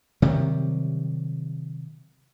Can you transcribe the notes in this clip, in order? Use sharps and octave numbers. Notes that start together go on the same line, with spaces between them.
C3 D#3 F#3 G3